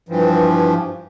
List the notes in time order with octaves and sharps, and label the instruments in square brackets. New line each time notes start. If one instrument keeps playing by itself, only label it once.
[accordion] G2 E3 F3